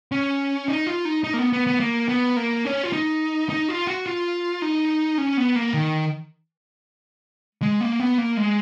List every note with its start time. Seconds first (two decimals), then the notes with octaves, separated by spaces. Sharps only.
0.12 C#4
0.68 D#4
0.86 F4
1.05 D#4
1.24 D#4
1.34 A#3
1.39 B3
1.53 B3
1.67 B3
1.80 A#3
2.09 B3
2.37 A#3
2.65 C#4
2.83 F4
2.93 D#4
3.50 D#4
3.68 F4
3.87 F#4
4.06 F4
4.62 D#4
5.18 C#4
5.37 B3
5.56 A#3
5.74 D#3
7.62 G#3
7.81 A#3
8.00 B3
8.18 A#3
8.37 G#3